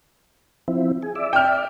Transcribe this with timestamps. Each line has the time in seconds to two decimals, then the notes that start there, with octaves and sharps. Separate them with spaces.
0.68 F3 C4 E4
1.02 G#4
1.15 D5 E5
1.33 G5 F6